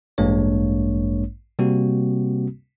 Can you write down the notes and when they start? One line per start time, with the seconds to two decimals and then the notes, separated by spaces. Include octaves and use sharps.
0.18 A1 G2 G#3 A#3 D4 C#5
1.59 C3 G3 A#3 C4 F#4